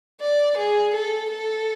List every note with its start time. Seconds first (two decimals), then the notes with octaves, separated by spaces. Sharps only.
0.21 D5
0.57 G#4
0.95 A4
1.32 A4